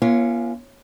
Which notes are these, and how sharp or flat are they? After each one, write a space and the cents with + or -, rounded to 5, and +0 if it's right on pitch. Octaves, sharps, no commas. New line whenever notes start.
A#3 +45 C#4 +0 F4 -30